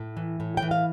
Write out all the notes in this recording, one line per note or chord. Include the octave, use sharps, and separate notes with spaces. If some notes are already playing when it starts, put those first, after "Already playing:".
Already playing: A2
E3
A2
E3 G5
F5